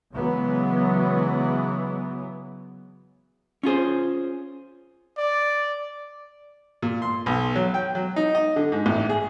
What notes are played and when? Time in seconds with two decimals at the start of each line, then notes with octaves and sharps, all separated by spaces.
0.14 C#3 E3 F#3 G#3 B3
3.63 C#4 F4 G#4 C5
5.18 D5
6.82 A#2
7.02 C6
7.26 B1
7.56 F#3
7.74 G5
7.95 F#3
8.16 D#4
8.35 D#5
8.56 D3
8.72 G#2
8.86 A1
9.09 G#4